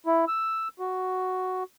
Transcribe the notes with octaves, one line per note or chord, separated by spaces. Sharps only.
E4
E6
F#4